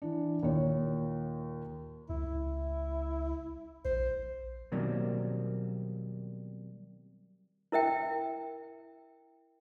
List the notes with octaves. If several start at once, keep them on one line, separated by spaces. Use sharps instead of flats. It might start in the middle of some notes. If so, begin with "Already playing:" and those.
E3 D4
D#2 A#2 C#5
C#2 E4
A#1 C5
B2 D#3 F#3 G3 A#3 C4
E4 A#4 E5 G5